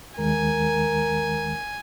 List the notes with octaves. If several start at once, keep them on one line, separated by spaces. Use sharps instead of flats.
D#2 D#3 G#3 A#4 G#5